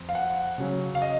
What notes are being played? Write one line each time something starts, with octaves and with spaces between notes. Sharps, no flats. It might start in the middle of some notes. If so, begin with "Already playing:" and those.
Already playing: F2
F5
F#5
C#3 F#3 C#4
F5
D#5